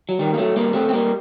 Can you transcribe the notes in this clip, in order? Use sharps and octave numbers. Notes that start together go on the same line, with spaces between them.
F#3
D#3 G3
A#3
F#3 A3
G3 A#3
A3 C4
C4
G3 A#3